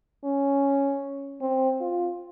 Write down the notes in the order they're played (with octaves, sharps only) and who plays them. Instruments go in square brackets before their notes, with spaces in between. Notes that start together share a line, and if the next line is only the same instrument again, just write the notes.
[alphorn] C#4
C4
F4